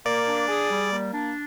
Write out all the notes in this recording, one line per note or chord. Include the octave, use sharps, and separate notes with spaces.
A#3 D5
D4
G#4
G3
A#3
D4